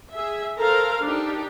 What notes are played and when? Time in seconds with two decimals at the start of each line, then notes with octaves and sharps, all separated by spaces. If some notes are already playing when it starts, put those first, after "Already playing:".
0.12 G#4 E5
0.59 A4 A#4 C5 F5 A#5
1.01 D4 D#4 G4